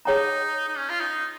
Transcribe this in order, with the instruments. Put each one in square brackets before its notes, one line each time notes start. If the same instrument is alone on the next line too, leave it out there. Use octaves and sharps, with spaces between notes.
[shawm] D#4 [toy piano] G#4 C#5 G5 A#5
[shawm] D#4
C#4
F4
D#4